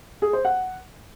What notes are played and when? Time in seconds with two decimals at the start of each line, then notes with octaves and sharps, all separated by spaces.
0.22 G#4
0.33 C5
0.45 F#5